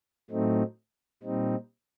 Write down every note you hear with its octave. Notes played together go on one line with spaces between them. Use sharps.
A2 F#3 A3 C4 D#4
A#2 G3 C4 D#4